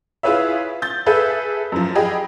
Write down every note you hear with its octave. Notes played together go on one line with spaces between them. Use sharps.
E4 F4 G#4 B4 C#5 E5
G6 A6
G#4 A4 B4 E5
F#2 F3
G4 G#4 D#5 B5